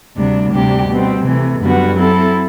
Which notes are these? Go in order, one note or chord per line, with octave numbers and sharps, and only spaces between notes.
D2 C3 G3 D4
D2 C3 G3 D4 G4
B2 G3 C4
C3 E3 A3
F#2 D3 G3 B3 F#4
F#3 C4 E4 A4